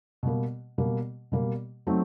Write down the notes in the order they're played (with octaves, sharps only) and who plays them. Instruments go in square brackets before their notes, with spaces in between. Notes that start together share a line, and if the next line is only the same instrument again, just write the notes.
[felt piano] B2 G3 A#3
B2 G3 A#3
B2 G3 A#3
F#3 A3 C4 D#4